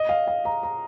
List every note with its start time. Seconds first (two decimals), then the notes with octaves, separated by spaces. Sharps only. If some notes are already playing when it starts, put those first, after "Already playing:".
Already playing: D#5
0.09 F5
0.27 F5
0.45 A#5
0.63 A#5